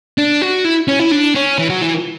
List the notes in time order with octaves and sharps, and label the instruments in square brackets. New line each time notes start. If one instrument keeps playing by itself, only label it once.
[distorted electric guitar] D4
F#4
E4
C#4
E4
D4
C#4
E3
F#3
E3